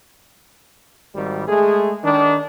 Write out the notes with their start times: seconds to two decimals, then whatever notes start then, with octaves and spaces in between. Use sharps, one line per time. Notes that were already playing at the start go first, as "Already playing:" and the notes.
1.15 G#1 G3
1.47 G#3 A3 G#4
2.04 D#3 D4